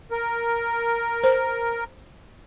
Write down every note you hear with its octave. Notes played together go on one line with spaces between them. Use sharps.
A#4
C5